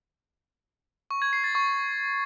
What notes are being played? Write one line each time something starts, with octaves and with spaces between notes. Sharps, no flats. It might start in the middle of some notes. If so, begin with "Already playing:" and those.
C#6
G#6
C7
A6
C#6